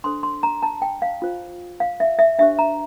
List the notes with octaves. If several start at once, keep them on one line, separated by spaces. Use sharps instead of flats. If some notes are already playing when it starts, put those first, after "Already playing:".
D4 A4 C5 C6
C6
A#5
A5
G5
F5
F4 C5
F5
E5
E5
D4 G4 C5 E5
A#5